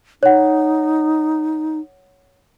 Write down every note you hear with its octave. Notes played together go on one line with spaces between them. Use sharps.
D#4 C#5 F#5